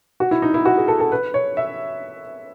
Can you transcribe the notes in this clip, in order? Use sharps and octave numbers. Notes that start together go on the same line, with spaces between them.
F#4
E4
D#4
E4
F#4
G#4
A4
A4
B4
C#5
E5